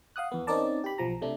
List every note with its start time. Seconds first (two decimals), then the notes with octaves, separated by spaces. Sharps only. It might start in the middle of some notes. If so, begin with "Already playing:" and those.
0.16 F5 F#5 D#6 F#6
0.32 E2 B3
0.47 C4 C#4 D#4 A#4 D5 A5
0.84 G4 B5
0.98 B1 F3 A#5
1.22 C3 A3 D4